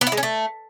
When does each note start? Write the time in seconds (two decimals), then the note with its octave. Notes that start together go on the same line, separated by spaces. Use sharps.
0.01 B3
0.07 E4
0.12 G#3
0.17 C#4
0.23 A3